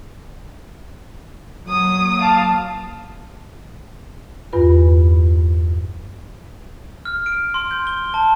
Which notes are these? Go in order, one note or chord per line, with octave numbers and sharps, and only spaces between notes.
F#3 A#3 D#6
F5 A5
E2 G2 F4 B4
F6
D7
C6
G6
G7
A5